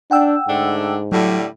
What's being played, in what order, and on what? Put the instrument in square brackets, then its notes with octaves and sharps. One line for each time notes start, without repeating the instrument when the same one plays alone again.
[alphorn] D4 [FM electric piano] F#5 G5 E6
[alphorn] G#2 [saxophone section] D3 A3 D4
[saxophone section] A2 D3 G3 [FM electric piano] F#3